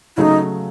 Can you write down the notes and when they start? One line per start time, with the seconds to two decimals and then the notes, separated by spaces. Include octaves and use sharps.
0.17 C#3 F#3 A3 D#4 E4